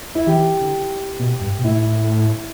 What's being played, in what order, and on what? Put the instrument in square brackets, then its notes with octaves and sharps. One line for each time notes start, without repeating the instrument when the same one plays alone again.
[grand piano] E4
[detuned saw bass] E3 [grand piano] G4
[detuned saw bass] D3
B2
G2
B2
[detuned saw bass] A2 [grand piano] E4